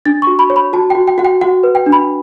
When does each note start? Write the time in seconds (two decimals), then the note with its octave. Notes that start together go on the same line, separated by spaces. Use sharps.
0.06 D4 A6
0.22 F#4 C#6
0.39 B5
0.50 C#5
0.56 B5
0.73 F#4 A5
0.90 F#4 G5
1.08 G5
1.18 F#4 F#5
1.25 G5
1.41 F#4 F#5
1.63 B4
1.75 G5
1.86 D4
1.92 B5